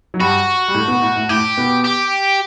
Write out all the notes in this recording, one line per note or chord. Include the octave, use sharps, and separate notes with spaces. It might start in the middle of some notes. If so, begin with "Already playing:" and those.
F#3
G2 G3 F#4
G3
A2 A3
B2 B3
A2 A3
A2 A3
A2 A3 G4
B2 B3
G4